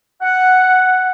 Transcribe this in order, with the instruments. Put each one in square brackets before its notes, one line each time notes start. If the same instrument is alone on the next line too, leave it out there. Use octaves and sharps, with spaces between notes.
[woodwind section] F#5